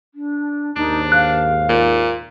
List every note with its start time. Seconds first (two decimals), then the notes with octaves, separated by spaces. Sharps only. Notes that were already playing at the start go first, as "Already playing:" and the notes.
0.15 D4
0.76 D#2 G#2 D4 D#4
1.12 F5 F#6
1.69 A#2